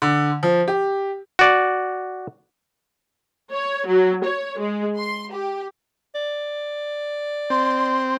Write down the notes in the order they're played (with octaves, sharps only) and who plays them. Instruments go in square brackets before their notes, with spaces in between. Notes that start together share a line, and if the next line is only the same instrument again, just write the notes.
[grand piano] D3
F3
G4
[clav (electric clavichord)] F#4 D5
[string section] C#5
F#3
C#5
G#3
C6
G4
[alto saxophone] D5
[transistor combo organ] C4 [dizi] C6